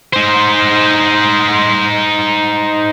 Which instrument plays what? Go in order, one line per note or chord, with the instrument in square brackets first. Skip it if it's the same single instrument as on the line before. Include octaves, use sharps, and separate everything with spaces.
[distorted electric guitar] D#4 C5